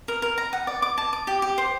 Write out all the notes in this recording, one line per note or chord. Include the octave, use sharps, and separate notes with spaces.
A#4
A#4
A#5
F#5
D5
D6
A5
D6
G4
G4
C5